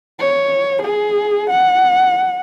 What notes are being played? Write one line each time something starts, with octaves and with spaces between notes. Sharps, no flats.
C#5
G#4
F#5